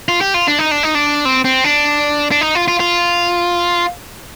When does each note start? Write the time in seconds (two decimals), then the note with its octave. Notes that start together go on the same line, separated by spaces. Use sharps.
0.09 F4
0.21 G4
0.34 F4
0.48 D4
0.59 D#4
0.71 D4
0.83 D#4
0.95 D4
1.25 C4
1.45 C4
1.64 D4
2.31 D4
2.41 D#4
2.55 F4
2.68 F4
2.80 F4